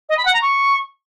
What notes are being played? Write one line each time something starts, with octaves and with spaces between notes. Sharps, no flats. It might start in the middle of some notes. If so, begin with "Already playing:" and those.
D#5
B5
F#5
A#5
C#6